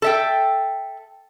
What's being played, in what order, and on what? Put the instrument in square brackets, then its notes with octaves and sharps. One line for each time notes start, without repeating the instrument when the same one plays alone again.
[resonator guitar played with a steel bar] A4 E5 G5